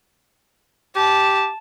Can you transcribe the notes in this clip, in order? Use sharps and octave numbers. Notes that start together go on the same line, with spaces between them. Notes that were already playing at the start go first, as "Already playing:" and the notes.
G4 A5